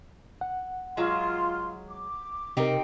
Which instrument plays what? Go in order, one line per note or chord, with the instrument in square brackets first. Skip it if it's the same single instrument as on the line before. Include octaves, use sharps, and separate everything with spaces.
[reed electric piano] F#5
[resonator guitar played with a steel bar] F#3 G#3 [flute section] F4 C6
[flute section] D6
[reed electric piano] C3 A#4 [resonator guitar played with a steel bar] C4 D#4 G4